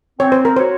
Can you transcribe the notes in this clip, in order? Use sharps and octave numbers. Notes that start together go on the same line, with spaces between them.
C4 C#5
C5
A#4
F#4 C5 C#5